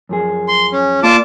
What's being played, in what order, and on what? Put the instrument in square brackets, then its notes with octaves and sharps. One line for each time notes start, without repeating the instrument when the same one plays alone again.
[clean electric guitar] F#2 F3 G#4
[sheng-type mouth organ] C6
C#4
[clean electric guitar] A#3 D5 [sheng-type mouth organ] F4 A5 D6